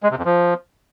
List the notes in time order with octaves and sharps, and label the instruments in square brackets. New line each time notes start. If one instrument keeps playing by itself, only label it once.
[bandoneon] G#3
C3
F2
F3